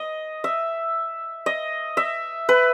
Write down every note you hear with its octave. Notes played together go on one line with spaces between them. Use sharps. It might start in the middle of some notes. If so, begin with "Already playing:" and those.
Already playing: D#5
E5
D#5
E5
B4